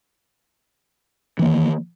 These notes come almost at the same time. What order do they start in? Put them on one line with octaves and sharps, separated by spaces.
E3 A#3 D#3